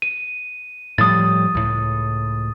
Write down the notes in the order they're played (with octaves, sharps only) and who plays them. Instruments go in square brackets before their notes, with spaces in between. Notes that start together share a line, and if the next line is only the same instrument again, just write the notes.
[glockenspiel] D#7
[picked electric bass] A2 F3 G3 [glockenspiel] D#6 A6
[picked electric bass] C#2 A2